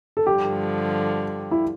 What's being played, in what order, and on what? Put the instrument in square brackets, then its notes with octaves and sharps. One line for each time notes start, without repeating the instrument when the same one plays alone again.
[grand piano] A4
[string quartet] G2 D3 F3 [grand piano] G4
[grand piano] E4